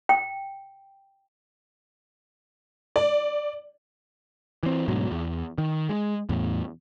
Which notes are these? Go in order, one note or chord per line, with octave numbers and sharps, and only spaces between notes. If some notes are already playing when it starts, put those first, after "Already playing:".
G5
D5
E3 C4
D2 G#2 B2 F#3
E2
D#3
G#3
E2 A2